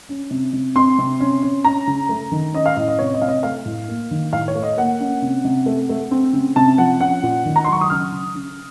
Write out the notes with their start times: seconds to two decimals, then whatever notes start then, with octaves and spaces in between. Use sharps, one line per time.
0.09 C#4
0.30 C3
0.53 C3
0.75 C4 C6
0.98 C3
1.20 C#4
1.42 C#4
1.65 C#4 A#5
1.87 C#3
2.09 A3
2.32 D#3
2.54 C#4 D#5
2.66 F5
2.76 A2 D#5
2.88 D#5
2.99 C3 C#5
3.14 D#5
3.22 C3 F5
3.28 D#5
3.43 A3 F5
3.66 A2
3.88 A#3
4.11 D#3
4.33 A2 F5
4.48 C#5
4.55 A3
4.63 D#5
4.77 A#3 F#5
5.00 C#4
5.22 C3
5.44 C3
5.66 A3
5.89 A3
6.11 C4
6.33 C#3
6.56 C3 A5
6.78 F3 F#5
7.01 C#4 F#5
7.23 A#2
7.45 D#3
7.56 A#5
7.64 F#3 C6
7.72 C#6
7.81 D#6
7.90 C#3 F6
8.12 C#3
8.35 C#3